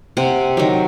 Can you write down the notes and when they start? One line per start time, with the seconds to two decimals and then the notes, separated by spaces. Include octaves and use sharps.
0.17 C3 F#5
0.57 D#3 F#3